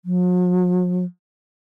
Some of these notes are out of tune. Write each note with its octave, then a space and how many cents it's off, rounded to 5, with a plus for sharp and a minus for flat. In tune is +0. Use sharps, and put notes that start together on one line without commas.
F#3 -45